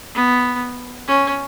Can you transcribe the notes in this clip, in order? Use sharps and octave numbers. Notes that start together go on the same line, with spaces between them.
B3
C#4